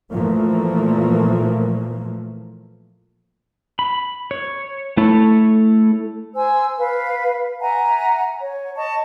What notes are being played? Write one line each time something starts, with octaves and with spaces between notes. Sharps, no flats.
A#2 E3 F3 A3 A#3
B5
C#5
A3 E4 A4 C#5
C5 G#5 E6
B4 F5
E5 F#5 G#5 A#5
C#5
D#5 A5 C#6